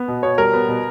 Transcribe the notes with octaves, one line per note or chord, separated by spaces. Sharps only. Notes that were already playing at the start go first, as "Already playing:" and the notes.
Already playing: B3
B2
B2 C#5
G3 A#4
B3
B2